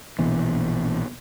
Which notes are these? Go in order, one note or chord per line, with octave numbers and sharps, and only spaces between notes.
A#1 B2 E3